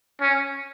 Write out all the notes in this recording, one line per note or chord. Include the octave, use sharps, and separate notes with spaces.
C#4